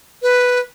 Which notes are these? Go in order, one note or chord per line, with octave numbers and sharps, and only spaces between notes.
B4